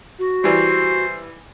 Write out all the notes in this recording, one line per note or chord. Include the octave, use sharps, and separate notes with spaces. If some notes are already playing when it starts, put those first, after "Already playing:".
F#4
E3 G3 C5